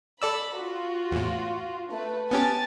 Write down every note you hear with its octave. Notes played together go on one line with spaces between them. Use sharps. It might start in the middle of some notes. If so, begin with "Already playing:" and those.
A4 D5 B5 E6
F4 F#4
E2 A2
A3 B4
B3 C#4 G4 G#5 A5 A6